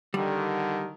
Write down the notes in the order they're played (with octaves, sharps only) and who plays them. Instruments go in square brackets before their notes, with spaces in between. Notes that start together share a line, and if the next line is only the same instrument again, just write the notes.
[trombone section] D3 D#3 [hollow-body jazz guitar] G3